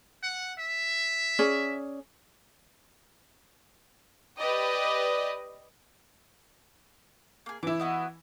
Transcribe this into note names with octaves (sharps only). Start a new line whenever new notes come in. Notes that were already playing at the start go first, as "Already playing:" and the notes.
F#5
E5
C#4 G#4 D5
G4 B4 D5 D#5
A#3 G#4
E3 E4 D6
B3 F#4 D#5